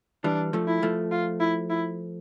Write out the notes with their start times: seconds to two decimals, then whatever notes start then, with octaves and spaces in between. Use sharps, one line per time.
0.24 E3 G3 D4
0.53 F3 A3
0.67 E4
0.82 F3 A3
1.11 F4
1.40 E4
1.70 E4